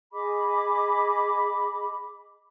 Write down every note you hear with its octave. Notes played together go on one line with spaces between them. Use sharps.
G#4 D#5 B5 D6